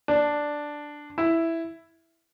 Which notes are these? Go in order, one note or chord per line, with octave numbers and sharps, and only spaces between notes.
D4
E4